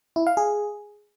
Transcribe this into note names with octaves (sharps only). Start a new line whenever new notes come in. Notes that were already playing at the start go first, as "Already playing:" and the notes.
E4
F5
G#4